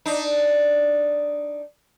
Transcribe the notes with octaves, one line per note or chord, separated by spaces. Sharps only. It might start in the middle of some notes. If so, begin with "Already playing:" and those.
D4 D#4